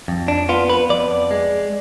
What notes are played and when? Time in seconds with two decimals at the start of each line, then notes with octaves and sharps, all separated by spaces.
0.08 F2
0.28 D4
0.49 B3 F4
0.70 B4
0.90 F2 D5
1.31 G#3